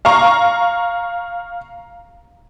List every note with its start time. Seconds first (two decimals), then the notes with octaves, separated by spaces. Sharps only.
0.05 F5 A#5 C#6